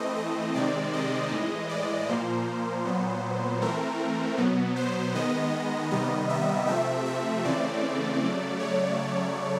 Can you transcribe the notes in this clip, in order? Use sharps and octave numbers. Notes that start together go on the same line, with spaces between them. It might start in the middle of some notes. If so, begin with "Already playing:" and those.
Already playing: E3 A3 C4 D#5
D#5
C3 D#3 G#3 C4 D5
D#5
A2 E3 G#3
D5
A#2 F3 A#3 C5
A#2 F#3 B3
E3 A3 C4 A#4
B2 F#3 B3
C5
D#3 G#3 B3 D#5
C3 D#3 G3 B3 D#5
E5
C3 F3 A3 C4 E5
E5
C#3 E3 A3 C4 D5
C#3 F#3 A3
C#5